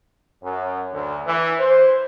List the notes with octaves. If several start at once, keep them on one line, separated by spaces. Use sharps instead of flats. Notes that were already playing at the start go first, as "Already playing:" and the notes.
F#2
D2
E3
C5